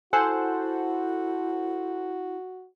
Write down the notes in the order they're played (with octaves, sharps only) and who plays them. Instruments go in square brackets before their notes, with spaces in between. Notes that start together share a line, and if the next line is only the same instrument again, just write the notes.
[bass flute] E4 [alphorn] F#4 [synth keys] A4 C5 F#5 [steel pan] G#5